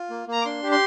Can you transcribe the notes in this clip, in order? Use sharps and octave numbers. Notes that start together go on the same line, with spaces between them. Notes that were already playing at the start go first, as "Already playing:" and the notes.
Already playing: F4
A#3
A#3 A#5
D6
D4 C6
G4
C6